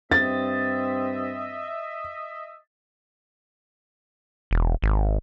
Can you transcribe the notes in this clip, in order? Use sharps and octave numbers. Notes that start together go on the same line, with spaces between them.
G2 C4 D#5 E5 A6
E1
G#1